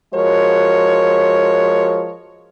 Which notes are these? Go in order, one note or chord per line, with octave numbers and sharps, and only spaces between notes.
F3 G#3 F#4 A#4 C#5